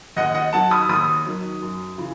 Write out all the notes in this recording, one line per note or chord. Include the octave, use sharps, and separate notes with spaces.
D#2 D#5 F#5
D#5 F#5
D#3 F#3 F#5 A5
B5 D#6
D#2 B5 D#6
D#3 F#3
F#2
C#3 E3